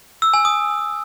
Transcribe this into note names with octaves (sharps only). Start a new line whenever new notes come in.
E6
G#5
D#6